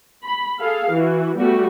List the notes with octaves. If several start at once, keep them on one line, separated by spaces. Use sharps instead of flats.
B5
G#4 A4 F5
E3 F#4
G3 A3 B3 F#4